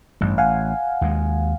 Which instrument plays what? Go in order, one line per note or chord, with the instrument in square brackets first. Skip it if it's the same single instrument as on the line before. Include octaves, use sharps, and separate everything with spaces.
[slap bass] A1 [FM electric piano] G2
[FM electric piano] F5 F#5 G#5
[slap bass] D#2 G#3